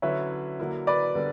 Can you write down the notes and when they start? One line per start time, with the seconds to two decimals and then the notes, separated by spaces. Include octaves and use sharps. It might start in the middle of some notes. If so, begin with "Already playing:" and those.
0.02 D3 F#3 C#4 E4 B4 C#5 E5
0.59 D3 F#3 A#3 E4
0.87 B4 D5
1.15 D3 G3 B3 D4 A#4